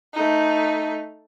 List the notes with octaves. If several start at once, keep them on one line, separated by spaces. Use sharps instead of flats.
A3 D#4